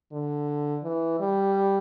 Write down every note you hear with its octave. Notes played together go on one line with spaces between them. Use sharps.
D3
E3
G3